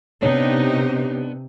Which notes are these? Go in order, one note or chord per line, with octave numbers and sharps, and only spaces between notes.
C3 B3 D4 D#4 G4 C#5